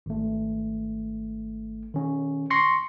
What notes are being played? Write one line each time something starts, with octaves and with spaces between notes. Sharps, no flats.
G#1 A3
D#3 C#4
C6 C#6 A#6 C7 C#7